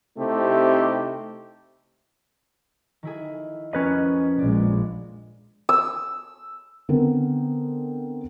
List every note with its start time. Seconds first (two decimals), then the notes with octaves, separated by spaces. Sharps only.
0.18 C3 A3 C4 D#4 E4 G4
3.03 D#3 E4 G#4
3.73 F2 C#4 A#4 B4 D#5
4.39 A#1 G#3 D5
5.69 E6
6.89 D3 B3 C4 A#4